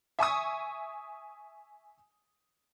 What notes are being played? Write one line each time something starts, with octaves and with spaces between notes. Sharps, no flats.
E5 G#5 C#6 D#6